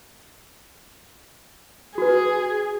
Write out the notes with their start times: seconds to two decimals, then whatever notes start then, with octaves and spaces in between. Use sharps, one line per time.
1.98 F#4 G#4 B4